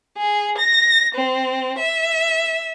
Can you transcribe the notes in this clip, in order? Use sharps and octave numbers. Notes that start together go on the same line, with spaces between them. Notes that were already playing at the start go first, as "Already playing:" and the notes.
G#4
A#6
C4
E5